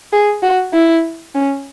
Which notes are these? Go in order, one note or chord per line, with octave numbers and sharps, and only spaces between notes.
G#4
F#4
E4
C#4